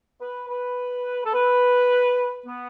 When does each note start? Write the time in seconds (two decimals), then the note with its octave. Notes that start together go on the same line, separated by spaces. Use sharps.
0.21 B4
0.49 B4
1.25 A4
1.34 B4
2.47 B3